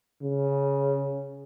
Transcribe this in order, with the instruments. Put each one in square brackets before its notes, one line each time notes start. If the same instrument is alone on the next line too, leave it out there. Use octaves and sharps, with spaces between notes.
[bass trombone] C#3